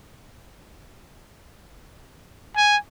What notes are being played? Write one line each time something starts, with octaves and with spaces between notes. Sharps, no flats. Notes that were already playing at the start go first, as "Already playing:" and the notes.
G#5